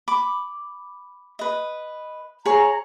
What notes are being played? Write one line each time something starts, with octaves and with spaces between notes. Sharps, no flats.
B5 D6
B4 D#5
G#4 C#5 A#5